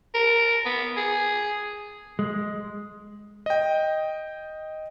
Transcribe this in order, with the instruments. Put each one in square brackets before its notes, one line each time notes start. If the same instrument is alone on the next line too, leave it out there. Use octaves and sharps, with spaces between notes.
[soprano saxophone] A#4
B3
G#4
[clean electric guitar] G#3
[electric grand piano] D#5 G5